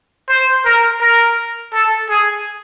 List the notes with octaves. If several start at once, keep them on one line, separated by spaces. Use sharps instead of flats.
C5
A#4
A#4
A4
G#4